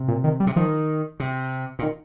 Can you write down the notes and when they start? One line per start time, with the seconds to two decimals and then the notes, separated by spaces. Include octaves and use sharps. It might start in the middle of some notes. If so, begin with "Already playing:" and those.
Already playing: C3
0.08 A#2
0.24 D#3
0.40 G3
0.47 C3
0.56 D#3 F3
1.20 C3
1.79 A#2
1.82 D#3